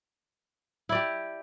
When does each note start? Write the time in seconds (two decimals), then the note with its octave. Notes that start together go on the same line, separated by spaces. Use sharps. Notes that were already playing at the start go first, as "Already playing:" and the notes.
0.89 E4
0.92 D5
0.95 G4